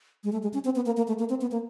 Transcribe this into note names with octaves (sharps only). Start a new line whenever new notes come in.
G#3
A3
G#3
C#4
C4
B3
A#3
A#3
A3
A#3
C4
B3
A#3